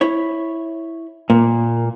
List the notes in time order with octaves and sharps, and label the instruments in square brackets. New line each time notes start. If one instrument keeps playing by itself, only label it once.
[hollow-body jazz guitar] E4 C#5
[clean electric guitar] A#2 [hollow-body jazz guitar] A#3